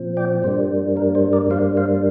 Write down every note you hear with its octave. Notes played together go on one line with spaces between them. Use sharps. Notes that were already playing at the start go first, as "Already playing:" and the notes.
Already playing: A#2 F3 C4
D5 G5
G2 G3 A#3 D4 C5
A#4
C5
A#4 D5
G2 G3 A#3 D4 C5 F5
C5 F5